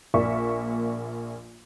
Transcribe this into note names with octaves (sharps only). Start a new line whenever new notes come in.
A#1 A#3 D5 E5 C#6